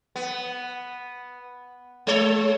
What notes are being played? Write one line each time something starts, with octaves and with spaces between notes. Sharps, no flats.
B3
G#3 C#5